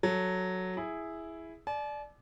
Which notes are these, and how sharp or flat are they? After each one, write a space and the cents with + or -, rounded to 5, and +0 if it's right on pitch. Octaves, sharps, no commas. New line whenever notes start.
F#3 +0 A4 +0
E4 +0 G#4 +0
D5 +5 A5 -45